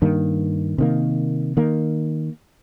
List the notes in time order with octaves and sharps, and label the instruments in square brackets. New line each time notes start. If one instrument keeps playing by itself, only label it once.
[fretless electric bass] G2 D#3 A#3
C3 D#3 A#3
D#3 A#3